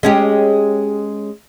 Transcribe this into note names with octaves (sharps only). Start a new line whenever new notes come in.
G#3 C#4 G4